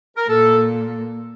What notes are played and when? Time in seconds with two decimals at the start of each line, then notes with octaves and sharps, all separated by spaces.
0.16 A#4
0.29 A#2 A4